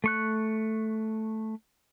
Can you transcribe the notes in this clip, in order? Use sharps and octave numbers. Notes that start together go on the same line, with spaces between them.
A3 C#6 F#6